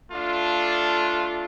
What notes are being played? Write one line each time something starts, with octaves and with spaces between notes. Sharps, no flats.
A3 D4 F4